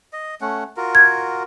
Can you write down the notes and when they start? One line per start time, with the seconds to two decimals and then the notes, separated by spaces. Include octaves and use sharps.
0.13 D#5
0.41 A3 C#4 F#5
0.77 F4 F#4 A#4
0.95 G#6